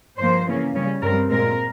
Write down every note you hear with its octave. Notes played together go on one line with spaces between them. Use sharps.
G2 F3 A#3 C5
C#3 E3 A#3 C#4
C#3 G3 C#4
G2 G3 C4 A#4
A#2 G#3 C4 A#4